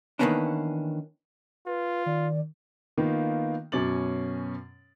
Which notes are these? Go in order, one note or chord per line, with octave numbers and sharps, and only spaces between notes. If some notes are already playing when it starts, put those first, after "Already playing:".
D#3 E3 A#3 B3 C#4 D4
F4 B4
D#3 D5
D#3 A#3 B3 D#4 F4
F#2 B2 C#4 D6 A6 F#7